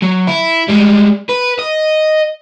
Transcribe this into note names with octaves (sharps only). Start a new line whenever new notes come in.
F#3
E4
G3 G#3
B4
D#5